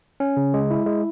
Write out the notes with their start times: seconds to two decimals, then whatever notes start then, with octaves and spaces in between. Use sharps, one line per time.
0.20 C#4
0.37 C#3
0.54 G#3
0.71 E4
0.86 G#3